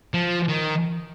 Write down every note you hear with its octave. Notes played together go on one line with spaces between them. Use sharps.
F3
D#3